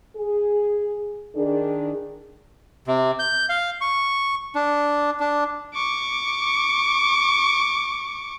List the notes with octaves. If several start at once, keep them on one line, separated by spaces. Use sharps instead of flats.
G#4
D#3 D4 G#4
C3
G6
F5
C#6
D4
D4
C#6 D6